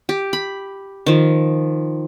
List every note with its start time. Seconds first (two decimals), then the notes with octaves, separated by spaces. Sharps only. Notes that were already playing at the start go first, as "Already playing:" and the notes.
0.09 G4
0.33 B5
1.06 D#3 F3